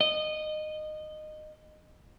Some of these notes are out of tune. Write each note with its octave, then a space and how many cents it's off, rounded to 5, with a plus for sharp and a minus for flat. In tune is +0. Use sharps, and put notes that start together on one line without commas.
D#5 -15